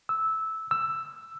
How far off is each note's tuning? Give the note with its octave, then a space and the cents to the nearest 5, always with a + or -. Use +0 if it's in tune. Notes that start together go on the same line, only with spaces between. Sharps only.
E6 -10
E6 +10